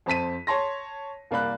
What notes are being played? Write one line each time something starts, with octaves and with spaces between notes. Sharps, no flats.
F2 C4 A5 B6 D#7
C#5 A5 C6 A#6
C2 A#3 D5 B5 F#6